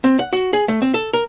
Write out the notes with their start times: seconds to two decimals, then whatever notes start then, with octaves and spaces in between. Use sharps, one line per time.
0.04 C4
0.19 F#5
0.33 F#4
0.53 G#4
0.68 A3
0.82 C4
0.94 A4
1.13 A#4